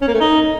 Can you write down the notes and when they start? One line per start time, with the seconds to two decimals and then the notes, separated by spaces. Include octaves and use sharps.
0.01 C#4
0.08 A#3
0.14 A3
0.20 D#4